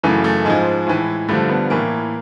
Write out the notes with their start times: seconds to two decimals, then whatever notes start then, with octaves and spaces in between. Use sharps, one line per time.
0.03 F#2 C#3 E3 A3
0.24 A3
0.45 G#2 F3 G#3
0.87 A2 E3
1.28 G2 D3 F3 A3
1.49 B3
1.70 A2 E3 A#3